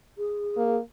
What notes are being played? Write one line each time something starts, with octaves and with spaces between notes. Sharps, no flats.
G#4
A#3